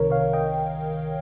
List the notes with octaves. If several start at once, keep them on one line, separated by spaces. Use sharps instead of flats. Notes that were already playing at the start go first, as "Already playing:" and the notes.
Already playing: C2 C3 D#3 A#4 C#5
C#5 F5
D#5 G5